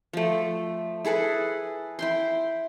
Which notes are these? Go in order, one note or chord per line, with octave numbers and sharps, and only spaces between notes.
F3 A3
E4 G#4 A4 B4
E4 G5 C6